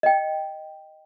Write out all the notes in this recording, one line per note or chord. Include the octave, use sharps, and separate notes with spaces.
D#5 G5